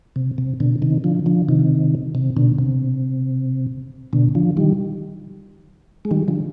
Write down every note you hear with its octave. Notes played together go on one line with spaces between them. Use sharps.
C3
C3
B2 D3
C3 D#3
D3 F3
D3 F3
C3 D#3
C3
B2 D3
C3
B2 D3
D3 F3
D#3 G3
G#3
D#3 G3
D3 F3